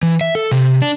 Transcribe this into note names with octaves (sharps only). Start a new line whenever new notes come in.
E3
E5
A4
C3
D4